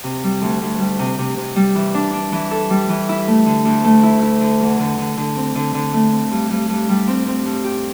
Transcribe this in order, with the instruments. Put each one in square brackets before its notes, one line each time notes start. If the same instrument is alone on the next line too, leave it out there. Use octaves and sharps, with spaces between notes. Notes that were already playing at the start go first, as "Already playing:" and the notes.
[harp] C3
G3
D2
D2
G3
C3
C3
C3
G3
E3
D4
D4
E3
A4
G3
E3
E4
A3
D3
D2
A3
E4
E4
D3
E2
D3
D3
D3
C4
D3
D3
A3
C4
G2
G2
G2
G3
C4
C4
G2
G4